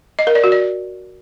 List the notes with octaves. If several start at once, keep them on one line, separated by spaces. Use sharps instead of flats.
D#5
A#4
D5
F#4
D5